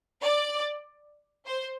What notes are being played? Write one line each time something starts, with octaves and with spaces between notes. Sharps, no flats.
D5
C5